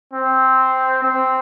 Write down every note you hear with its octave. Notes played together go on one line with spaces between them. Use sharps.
C4
C4